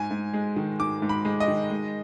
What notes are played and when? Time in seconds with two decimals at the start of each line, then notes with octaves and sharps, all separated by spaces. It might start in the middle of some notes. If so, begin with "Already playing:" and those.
Already playing: G#2 G#5
0.11 G#2
0.34 G#3
0.56 D#3
0.79 G#2 D6
1.02 G#2
1.09 B5
1.25 G#3
1.40 D#5
1.48 D#3
1.70 G#3